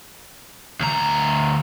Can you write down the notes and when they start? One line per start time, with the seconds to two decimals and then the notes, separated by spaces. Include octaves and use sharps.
0.80 D2 A#5